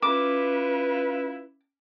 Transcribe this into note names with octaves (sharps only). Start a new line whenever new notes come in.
C#4 E4 F4 B4 D6